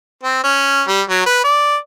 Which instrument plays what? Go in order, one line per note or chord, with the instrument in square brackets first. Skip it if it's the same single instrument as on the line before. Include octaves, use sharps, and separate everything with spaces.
[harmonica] C4
C#4
G3
F#3
B4
D5